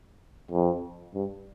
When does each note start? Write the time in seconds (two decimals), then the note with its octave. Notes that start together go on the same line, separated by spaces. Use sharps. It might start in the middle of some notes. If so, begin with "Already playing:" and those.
0.52 F2
1.15 G2